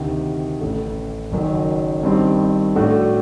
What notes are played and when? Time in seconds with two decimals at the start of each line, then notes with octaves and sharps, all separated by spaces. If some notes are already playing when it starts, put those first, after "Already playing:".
Already playing: D2 C3 D#3
0.61 A1 A2 A3
1.31 F#1 F#2 D#3 F#3
2.03 G2 D#3 G3 C4
2.76 A2 A3 D4 F#4